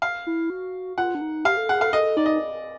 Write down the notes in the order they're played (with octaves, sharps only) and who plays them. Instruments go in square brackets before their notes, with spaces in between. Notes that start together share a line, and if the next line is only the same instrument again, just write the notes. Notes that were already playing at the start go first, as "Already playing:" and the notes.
[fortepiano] F5
[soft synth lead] E4
F#4
[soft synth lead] F4 [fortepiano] F#5
[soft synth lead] D4
D#4
[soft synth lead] G4 [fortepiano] F5
[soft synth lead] A4
[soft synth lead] G#4 [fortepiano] F#5
[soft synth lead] A4 [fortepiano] F5
[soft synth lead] A4 [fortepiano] D#5
[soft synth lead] D#4 [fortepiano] D5
[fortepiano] D#5